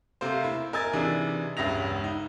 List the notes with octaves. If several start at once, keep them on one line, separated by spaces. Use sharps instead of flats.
C3 A3 A#3 C5
E4
A#4 D#5 G#5 E6 G#6 A6
C3 E3 D4 D#4 G#4
E1 C#2 G2 E5 A#6 F7
D#4